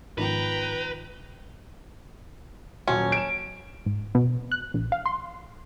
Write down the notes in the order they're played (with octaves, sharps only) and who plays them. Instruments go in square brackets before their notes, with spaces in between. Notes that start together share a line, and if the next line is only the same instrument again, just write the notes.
[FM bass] G#2 [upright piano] D#3 F3 B3 [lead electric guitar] B4 [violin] G5 A#5
[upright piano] D#1 F#3 [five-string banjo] C#4
[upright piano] D7 E7
[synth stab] G#2
B2
F#6
A#1
F5
C6